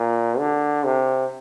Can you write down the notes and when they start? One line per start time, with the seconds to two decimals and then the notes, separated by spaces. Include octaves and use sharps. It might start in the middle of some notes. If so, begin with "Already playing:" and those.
Already playing: A#2
0.39 D3
0.84 C3